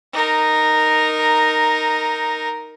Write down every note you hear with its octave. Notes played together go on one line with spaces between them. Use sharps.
D#4 A#4